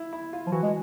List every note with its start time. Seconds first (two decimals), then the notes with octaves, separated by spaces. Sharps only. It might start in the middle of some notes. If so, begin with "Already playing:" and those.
Already playing: E4
0.13 E4
0.33 F4
0.46 F3
0.52 E3 F#4
0.63 G#3